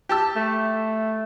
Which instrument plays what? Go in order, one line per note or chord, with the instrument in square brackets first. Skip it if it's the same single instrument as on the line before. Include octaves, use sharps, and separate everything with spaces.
[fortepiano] G4 A5 E6
[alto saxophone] A3